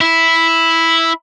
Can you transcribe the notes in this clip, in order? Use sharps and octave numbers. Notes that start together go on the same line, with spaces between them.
E4